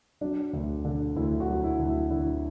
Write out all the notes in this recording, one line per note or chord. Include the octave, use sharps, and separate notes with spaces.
F#3 D4
D2
D3
D2 E4
F#4
F#3
F#4
E4
D2
E4
D3 E4